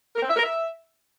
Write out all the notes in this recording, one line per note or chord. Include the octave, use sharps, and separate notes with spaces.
A#4
C4
E5
A#4
E5